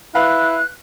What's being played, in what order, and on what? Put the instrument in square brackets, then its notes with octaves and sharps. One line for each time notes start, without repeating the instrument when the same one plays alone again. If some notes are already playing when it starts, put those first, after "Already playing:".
[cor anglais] E4 [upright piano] B4 F5 [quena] F#6